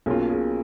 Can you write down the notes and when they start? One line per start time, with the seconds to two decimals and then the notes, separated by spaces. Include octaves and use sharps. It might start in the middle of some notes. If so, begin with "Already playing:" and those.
0.06 B1 B2 A#3 C#4 F4 G#4
0.29 G#4